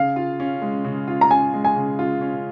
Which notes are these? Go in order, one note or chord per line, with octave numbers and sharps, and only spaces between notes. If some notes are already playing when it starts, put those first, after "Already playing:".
Already playing: C#3 F5
F4
C#4
G#3
C#3
F4
A#5
C#4 G#5
G#3
G#5
C#3
F4
C#4